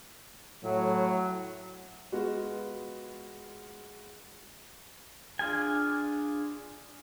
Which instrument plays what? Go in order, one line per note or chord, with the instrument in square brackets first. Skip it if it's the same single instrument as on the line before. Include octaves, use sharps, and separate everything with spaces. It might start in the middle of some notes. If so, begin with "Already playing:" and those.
[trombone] A2 [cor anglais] F#3
[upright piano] G#3 B3 F4 F#4
[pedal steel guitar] D4 F4 G#4 G#5